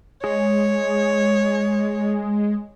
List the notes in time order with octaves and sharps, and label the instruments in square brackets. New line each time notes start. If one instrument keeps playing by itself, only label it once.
[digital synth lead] G#3 [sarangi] C#5